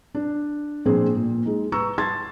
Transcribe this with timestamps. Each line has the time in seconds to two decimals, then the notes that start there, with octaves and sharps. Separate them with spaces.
0.15 D4
0.85 A#2 F3 C4 D4 G#4
1.15 A#2
1.46 G#3 D#4
1.72 B4 A#5 C#6 E6
1.98 A5 C6 G#6 A6